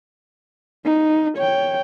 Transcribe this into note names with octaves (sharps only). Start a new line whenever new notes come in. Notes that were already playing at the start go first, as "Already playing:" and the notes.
D#4
C#5 G5